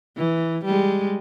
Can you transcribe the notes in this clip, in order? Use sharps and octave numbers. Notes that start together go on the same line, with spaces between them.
E3
G3 G#3